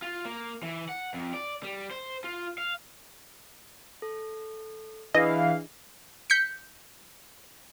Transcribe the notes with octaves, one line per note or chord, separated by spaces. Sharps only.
F4
A#3
E3
F#5
F2
D5
G3
C5
F4
F5
A4
E3 D4 G#4 D#5 F5
G6 B6 C#7